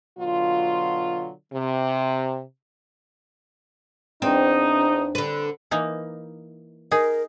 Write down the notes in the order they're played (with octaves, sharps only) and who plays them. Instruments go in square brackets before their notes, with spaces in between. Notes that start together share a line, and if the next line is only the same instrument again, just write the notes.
[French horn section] B2 D3 F#3 F4
C3
[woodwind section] E2 D#4 [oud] C4 [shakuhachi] D4
[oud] D3 B4
[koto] E3 A#3 D#4
[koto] D#4 G#4 [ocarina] A#4